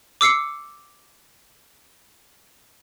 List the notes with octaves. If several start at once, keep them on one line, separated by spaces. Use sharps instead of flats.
D6 E6 C7 C#7